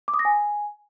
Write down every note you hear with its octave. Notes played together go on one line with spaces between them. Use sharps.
D6
D#6
A#6
G#5